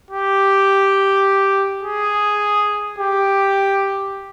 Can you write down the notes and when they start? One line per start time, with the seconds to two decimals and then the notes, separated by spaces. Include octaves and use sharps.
0.11 G4
1.83 G#4
2.99 G4